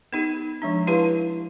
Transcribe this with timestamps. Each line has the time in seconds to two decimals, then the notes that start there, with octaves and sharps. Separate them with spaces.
0.13 B3 D#4 G4
0.62 F3 G#3 D4
0.87 E4 G4 B4 F5 A5